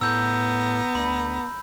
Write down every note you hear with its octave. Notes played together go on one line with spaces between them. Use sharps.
A2 B3 A#5 E6 G6
D2 B5